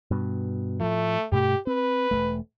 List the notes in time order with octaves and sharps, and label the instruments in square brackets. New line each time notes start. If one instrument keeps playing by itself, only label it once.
[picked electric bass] G2 B2
[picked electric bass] A2 F3 [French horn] A3
[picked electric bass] G2 B2 A3 [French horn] G4
[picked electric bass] C4 [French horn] B4
[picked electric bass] E1 F2 A3